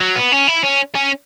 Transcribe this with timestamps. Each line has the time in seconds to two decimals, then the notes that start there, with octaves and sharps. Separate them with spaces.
0.01 F#3
0.16 B3
0.32 C#4
0.48 E4
0.64 C#4
0.95 C#4